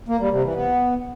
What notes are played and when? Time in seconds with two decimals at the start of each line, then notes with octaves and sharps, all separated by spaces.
0.08 A#3
0.20 G3
0.32 C3
0.43 E3
0.55 B3